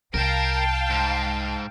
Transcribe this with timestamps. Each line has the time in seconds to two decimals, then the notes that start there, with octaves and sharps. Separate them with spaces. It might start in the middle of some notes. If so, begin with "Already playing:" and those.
0.14 C2 A#4 F5 G5 A5
0.90 G#2